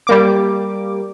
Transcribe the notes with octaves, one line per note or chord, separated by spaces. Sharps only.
G3 A#3 D6